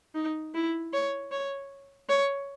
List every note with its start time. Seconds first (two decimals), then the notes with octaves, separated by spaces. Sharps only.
0.15 D#4
0.54 E4
0.93 C#5
1.32 C#5
2.09 C#5